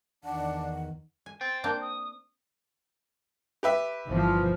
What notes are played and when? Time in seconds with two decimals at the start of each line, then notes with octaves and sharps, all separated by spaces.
0.24 E2 D#3 D4 F#5
1.26 G#5
1.41 C5 G5 A6
1.64 A#3 C4 D4 G6
1.81 D#6
3.63 G4 B4 E5
4.08 G1 E3 F3